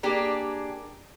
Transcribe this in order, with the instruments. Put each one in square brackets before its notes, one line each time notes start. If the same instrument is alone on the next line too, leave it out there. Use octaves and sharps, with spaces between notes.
[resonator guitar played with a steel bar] A#3 D4 G4 G#4